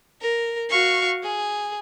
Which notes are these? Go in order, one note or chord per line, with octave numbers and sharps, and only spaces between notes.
A#4
F#4 F5 C#6
G#4